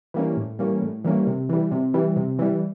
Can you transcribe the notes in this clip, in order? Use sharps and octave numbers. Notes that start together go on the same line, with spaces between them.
E3 G3 A#3 C#4
A2
E3 G3 A#3 C#4
A2
E3 G3 A#3 C#4
C3
E3 G3
C3
E3 G3
C3
E3 G3